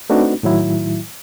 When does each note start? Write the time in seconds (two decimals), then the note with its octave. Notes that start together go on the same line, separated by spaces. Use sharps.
0.10 A3 C4 D4 D#4 F#4 B4
0.43 A2 D#3 F#3 E4